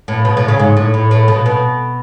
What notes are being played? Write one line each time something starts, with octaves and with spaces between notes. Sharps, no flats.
A2
B2
A2
C#3
G#2
A2
A2
A2
B2
B2